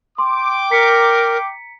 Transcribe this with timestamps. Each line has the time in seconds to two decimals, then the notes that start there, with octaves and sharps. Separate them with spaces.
0.18 G5 C6 D6
0.71 A#4 A#5 B6 C#7